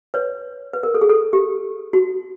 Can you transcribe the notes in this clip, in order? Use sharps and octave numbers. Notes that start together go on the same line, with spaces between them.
B4 C#5
B4
A#4
A4
G#4
A4
G4
F#4